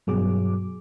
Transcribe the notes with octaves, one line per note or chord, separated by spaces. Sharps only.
G2 B2 F#3 G#4 D6